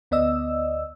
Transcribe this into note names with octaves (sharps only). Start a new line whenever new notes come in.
D2 B3 D5 D#5 E6